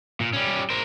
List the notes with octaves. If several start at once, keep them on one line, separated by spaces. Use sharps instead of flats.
A#2
G3 C#4
A#4 C5